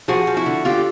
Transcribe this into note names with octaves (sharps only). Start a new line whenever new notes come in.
F3 F#4 G#4
F3
E4 F#4
D3
D3 F4 G4